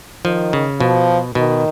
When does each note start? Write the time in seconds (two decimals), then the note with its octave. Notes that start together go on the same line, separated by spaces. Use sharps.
0.25 D#3 F3
0.53 C#3
0.80 B2 F3
1.35 B2 D#3